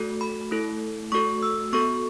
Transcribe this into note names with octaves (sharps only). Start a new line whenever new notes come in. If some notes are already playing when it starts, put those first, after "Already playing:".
Already playing: A3 F#4 A4
B5
A3 E4 A4
A3 F#4 A4 C#6
E6
B3 F#4 A4 C#6